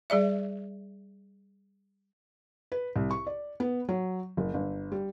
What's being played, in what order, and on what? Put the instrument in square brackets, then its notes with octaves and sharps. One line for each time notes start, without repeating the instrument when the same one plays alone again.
[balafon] G3 G#4 D5 E5
[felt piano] B4
C2
C#6
D5
B3
F#3
F#1
G1
G3